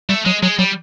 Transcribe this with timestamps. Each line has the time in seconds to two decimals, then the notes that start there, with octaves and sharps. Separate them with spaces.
0.09 G3 A3
0.25 F#3 G#3
0.43 F#3 G#3
0.59 F#3 G3